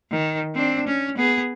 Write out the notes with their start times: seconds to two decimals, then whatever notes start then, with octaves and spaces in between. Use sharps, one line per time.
0.11 D#3
0.55 C4 D4
0.87 C#4
1.17 B3 G#4